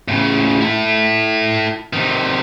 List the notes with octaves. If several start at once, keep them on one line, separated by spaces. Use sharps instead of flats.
A2 C#3
E4 A4
C3 D#3